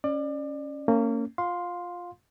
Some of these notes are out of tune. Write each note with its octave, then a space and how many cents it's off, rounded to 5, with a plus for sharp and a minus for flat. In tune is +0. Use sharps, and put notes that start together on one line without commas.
C#4 +0 D5 +30
A#3 -30 C#4 +0
F4 +5 F5 +20 C6 +0